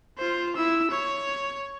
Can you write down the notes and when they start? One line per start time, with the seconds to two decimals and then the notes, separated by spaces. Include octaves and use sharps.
0.18 F4 C5
0.56 E4 E6
0.91 C#5